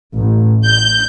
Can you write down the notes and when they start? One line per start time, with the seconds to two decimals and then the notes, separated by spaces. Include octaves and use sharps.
0.15 A1
0.66 G6